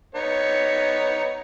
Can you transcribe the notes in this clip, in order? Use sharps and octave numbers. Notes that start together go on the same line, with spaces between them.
B3 D#4 C#5